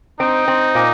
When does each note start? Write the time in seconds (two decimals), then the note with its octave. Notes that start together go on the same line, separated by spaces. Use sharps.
0.20 C4 D#4
0.48 C4
0.75 A#2